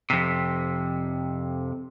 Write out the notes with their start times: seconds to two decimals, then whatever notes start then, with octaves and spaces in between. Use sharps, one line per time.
0.10 F2 C3